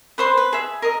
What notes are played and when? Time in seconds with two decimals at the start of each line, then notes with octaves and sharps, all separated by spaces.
0.18 B4 C5 C6
0.37 B4
0.53 G#4 E5
0.82 A#4 D#5